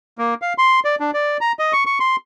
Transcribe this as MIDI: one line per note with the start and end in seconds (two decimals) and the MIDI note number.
0.18 0.34 58
0.42 0.53 77
0.58 0.80 84
0.85 0.95 74
1.00 1.11 62
1.14 1.37 74
1.41 1.52 82
1.59 1.73 75
1.73 1.84 85
1.86 1.99 85
2.00 2.16 84